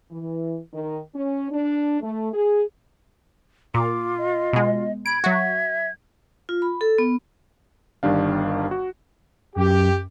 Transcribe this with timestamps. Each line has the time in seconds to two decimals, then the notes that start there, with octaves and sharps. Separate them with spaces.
0.11 E3
0.72 D#3
1.14 C#4
1.50 D4
2.01 A3
2.33 G#4
3.74 A#2 F4 D6
4.18 D#5
4.53 B2 G#3
5.06 B5 G#6 D7
5.24 F#3 F#4 E5
6.49 F4
6.62 B5
6.81 A4
6.98 B3
8.03 G1 D#3 G3 D4 F5
8.71 F#4
9.56 F#2 G4